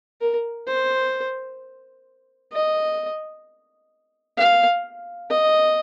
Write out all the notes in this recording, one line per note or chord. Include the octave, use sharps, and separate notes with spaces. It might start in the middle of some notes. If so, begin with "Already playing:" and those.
A#4
C5
D#5
F5
D#5